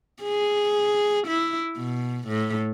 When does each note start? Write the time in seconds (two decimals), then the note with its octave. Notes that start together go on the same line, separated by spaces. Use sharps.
0.23 G#4
1.27 E4
1.77 B2
2.28 A2